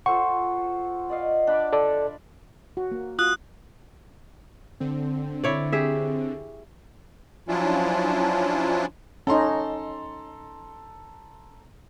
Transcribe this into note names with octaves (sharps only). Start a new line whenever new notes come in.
F4 A4 C5 F#5 C#6
D5 D#5 F5
D4 B5 D6
A4 D5
F#4
A#3
F4 F#4 D#6 F#6
D3 C4
E4 C#5 D5
G4 G#4 E5
F3 F#3 C#4 D4 E4 F4
C#4 D#4 A4 A#5 C6